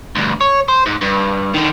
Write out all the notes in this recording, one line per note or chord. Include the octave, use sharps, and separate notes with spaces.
D2 G2
C#5
C5
G#2
G2
D3 D#3